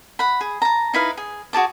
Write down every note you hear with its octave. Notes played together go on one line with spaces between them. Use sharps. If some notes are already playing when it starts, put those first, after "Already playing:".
F#5 B5
G#4
A5 A#5
D#4 E4 B4 F5
G#4
F#4 G#4 A5 D6